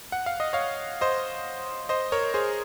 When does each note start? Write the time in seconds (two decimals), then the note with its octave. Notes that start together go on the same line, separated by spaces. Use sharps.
0.12 F#5
0.26 F5
0.40 D#5
0.53 C#5 F5
1.01 C5 D#5
1.89 C5 D#5
2.12 A#4 C#5
2.34 G#4 C5